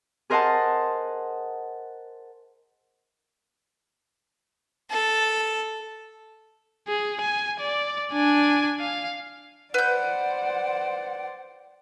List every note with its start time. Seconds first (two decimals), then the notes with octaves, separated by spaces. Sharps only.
0.30 G#4 A#4 C5 D#5 F#5 A5
4.90 A4
6.88 G#4
7.21 G#5
7.60 D5
8.13 D4 G#5
8.80 F5
9.74 B4 C5 D5 F#5 G6